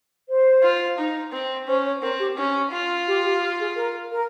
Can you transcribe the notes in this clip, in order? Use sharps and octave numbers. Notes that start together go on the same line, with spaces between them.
C5
F4
D#4
C4
C#4 C5
C#5
C4 A#4
G4
C#4
F4
G4
G4
G#4
A#4
A#4